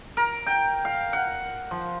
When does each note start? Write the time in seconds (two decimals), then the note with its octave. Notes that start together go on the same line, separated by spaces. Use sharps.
0.17 A#4
0.46 G5
0.85 F5
1.13 F#5
1.71 F3